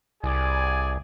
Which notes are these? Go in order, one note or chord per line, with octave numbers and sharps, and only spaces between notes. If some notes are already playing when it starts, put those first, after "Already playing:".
C2 G#4 D5 G#5